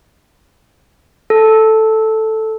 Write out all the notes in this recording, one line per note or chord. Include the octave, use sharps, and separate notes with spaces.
A4